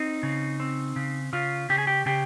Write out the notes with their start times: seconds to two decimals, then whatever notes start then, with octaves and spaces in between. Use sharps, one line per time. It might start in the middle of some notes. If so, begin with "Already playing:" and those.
Already playing: C4 D#4
0.23 C#3
0.60 C4
0.96 C#3
1.33 C#3 F4
1.69 C#3 G4
1.78 G#4
1.87 G4
2.06 C#3 G4